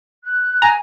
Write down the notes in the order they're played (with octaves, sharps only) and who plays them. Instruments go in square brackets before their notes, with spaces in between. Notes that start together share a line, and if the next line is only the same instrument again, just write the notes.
[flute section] F#6
[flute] G#5 [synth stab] A#5